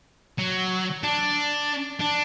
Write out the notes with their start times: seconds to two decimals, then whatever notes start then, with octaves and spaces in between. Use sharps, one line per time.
0.38 F#3
1.03 D4
2.01 D4